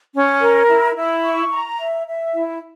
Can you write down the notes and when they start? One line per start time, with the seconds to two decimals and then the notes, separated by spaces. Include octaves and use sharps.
0.14 C#4
0.41 A#4
0.68 E4
0.96 E4
1.23 C#6
1.51 A#5
1.79 E5
2.06 E5
2.34 E4